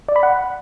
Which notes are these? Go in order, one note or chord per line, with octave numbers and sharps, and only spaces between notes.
D5
B5
F#5